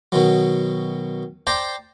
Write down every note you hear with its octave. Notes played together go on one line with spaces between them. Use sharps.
B2 D#3 F#3
C5 D5 G5 A5 A#5 C6